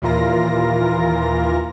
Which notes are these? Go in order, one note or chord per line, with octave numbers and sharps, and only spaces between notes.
D#2 A#2 E3 F4 A#4 A#6